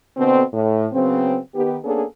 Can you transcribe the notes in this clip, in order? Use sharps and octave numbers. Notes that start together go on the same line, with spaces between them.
B2 D3 C4
A2
C#3 F#3 B3 C4
D#3 B3 G4
A#3 B3 C#4 D4 G#4 A4